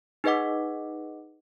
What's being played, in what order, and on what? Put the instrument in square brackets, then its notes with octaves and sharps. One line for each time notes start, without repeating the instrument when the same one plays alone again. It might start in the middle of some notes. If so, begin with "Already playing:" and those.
[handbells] D#4 G#4 B4 D#5 F#5 D6